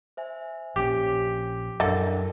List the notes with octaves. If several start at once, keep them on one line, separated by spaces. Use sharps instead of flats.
C5 E5 G#5
A#1 C#4 G4
F#2 D3 E3 D4 A4 A#4 A#6